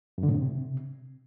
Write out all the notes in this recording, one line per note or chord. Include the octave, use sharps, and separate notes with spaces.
F#2
D3
A2
C3